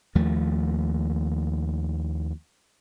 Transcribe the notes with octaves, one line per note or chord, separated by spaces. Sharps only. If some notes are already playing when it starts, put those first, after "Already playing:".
D#2 F3 A3